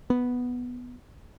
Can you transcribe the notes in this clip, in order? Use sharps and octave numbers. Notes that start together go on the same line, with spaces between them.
B3